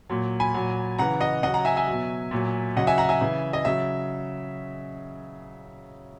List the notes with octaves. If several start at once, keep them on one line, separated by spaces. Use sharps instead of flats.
A#2 F#3
G#5 B5
A#2 F#3
C#3 E3 F#5 A#5
D#5 F#5
C#3 F#3 D#5 F#5
F#5 A#5
E5 G#5
E5 G#5
F#3
B2
A#2 F#3
C#3 F#3 D#5 F#5
E5 G#5
F#5 A#5
E5 G#5
C#3 E3
D#5
C#3 F#3 E5